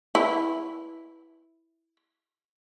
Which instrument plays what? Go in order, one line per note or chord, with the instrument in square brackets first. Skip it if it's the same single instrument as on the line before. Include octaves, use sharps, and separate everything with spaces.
[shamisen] E4 B4